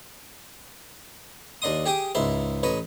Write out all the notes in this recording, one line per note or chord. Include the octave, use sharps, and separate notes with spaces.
D#2 D4 D#5 C6 D#6
G4 G#4 G5 D6 D#6
C#2 G#2 E4 E5 C6
A1 B4 C#5 D#5